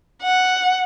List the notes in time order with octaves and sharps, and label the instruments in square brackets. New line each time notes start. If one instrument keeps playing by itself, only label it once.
[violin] F#5